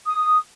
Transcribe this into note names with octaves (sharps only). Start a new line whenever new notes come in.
D#6